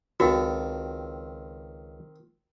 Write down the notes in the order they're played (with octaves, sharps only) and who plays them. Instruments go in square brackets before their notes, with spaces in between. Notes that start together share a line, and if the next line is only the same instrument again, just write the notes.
[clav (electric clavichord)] C#2 A4 [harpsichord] D#3 C4 [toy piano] F#4